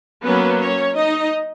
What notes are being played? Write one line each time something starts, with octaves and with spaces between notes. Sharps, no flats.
F#3 A#3 B3 C#4 B4
C#4 C#5
D#4 D#5